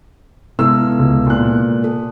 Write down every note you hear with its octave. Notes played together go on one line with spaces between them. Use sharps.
C3 G#3 B3 E4 A4 E6
C#2
A#2 F#6
A4